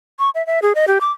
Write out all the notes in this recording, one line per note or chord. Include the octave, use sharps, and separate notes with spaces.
C#6
E5
E5
G#4
D#5
G4
D6